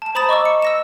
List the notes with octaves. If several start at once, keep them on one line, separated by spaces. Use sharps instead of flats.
A5 E7
C5 A#5 B5 D#6 A6 E7
D#5 C#6 D6 E6
C#7
E6 A#6 E7